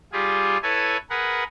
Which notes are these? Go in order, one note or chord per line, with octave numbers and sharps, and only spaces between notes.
G3 F4 G4 G#4
E4 A4 B4 C#5 G#5
G#4 A#4 B4 F#5